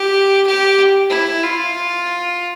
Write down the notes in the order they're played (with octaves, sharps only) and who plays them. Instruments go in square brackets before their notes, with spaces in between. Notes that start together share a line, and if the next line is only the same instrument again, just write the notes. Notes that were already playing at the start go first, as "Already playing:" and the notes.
Already playing: [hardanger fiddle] G4
G4
E4
F4